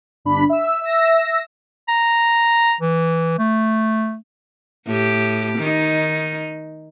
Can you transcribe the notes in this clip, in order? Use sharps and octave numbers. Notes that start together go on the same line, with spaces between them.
G1 D4 B5
E5 E6
E5 E6 A#6
A#5
E3
A3
A2 G4
D#3 D#4